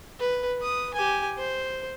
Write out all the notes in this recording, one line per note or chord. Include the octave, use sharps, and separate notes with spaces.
B4
B4 D#6
G4 G#5
C5